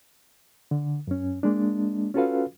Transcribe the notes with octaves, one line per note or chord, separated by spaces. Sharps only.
D3
F#2 C#4
G#3 A#3 D4
C#4 F4 F#4 A4 B4 F5